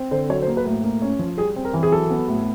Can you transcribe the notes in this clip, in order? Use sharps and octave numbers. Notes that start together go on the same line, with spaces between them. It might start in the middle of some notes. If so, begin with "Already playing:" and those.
Already playing: C4
D3 C5
F#3 C#5
C5
A#3
B4
A2
A#3
C#4
F3
G3 G#4
C4
A#4
E3
G#4
F#3 A4
B3
A2